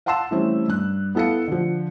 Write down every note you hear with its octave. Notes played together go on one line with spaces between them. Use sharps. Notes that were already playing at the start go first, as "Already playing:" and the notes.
F5 F#5 A5 C6 E6 E7
E3 G3 A3 C4 C#4
G2 F#6
B3 E4 A4 F5 C#7
D3 F3